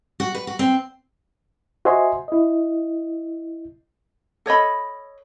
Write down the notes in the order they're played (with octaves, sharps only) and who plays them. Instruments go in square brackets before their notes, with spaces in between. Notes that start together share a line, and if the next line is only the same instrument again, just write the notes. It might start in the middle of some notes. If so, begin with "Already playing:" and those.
[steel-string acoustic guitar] F#4
B4
F#4
C4
[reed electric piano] F#4 C5 D#5 E5 G#5 C6
E4 D#5
[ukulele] A4 C#5 D#5 B5